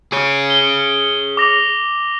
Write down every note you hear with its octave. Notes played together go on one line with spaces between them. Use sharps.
G#4 C#5
G7
D6 A#6 F7